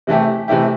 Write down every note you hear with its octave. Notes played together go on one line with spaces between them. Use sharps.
C3 E3 A3 E4 G4
C3 E3 A3 E4 G4